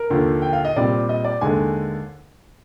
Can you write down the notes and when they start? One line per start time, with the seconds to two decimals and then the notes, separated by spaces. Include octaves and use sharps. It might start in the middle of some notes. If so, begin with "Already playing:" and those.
Already playing: A#4
0.10 D#2 D3 F3
0.42 G5
0.53 F5
0.65 D#5
0.76 A#2 G3 C4 D5
1.09 D#5
1.25 D5
1.41 D#2 D3 G#3 G#5